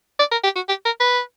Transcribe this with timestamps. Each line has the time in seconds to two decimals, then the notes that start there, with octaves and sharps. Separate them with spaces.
0.19 D5
0.32 A#4
0.44 G4
0.56 F#4
0.69 G4
0.85 A#4
1.00 B4